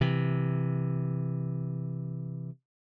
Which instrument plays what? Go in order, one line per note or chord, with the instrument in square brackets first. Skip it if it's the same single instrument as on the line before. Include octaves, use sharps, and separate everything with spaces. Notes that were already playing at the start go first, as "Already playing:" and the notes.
[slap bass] C3 E3